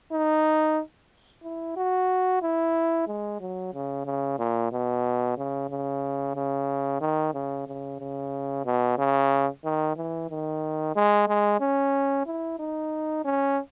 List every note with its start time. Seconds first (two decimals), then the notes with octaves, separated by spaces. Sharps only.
0.12 D#4
1.43 E4
1.76 F#4
2.42 E4
3.07 G#3
3.40 F#3
3.74 C#3
4.06 C#3
4.39 A#2
4.72 B2
5.38 C#3
5.70 C#3
6.36 C#3
7.01 D#3
7.34 C#3
7.67 C#3
8.00 C#3
8.65 B2
8.99 C#3
9.64 D#3
9.96 E3
10.30 D#3
10.96 G#3
11.28 G#3
11.61 C#4
12.27 E4
12.59 D#4
13.25 C#4